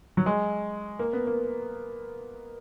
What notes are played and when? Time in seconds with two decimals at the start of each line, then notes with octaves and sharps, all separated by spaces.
0.17 F#3
0.26 G#3
0.99 A#3
1.13 B3
1.27 A#3